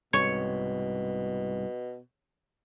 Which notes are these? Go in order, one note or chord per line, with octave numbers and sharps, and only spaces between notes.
C2 G#2 B2 C#5